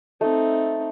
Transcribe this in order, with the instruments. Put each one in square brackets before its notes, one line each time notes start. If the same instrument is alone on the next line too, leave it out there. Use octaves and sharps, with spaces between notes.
[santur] A3 [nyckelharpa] C4 D#4